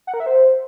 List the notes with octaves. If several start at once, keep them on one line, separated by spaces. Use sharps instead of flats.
F#5
A#4
E5
C5